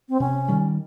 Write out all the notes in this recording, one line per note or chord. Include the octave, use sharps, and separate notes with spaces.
C4
C3 C#4
D#3 G3